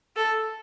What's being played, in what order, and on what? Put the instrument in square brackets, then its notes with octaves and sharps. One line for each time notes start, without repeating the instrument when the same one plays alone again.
[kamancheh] A4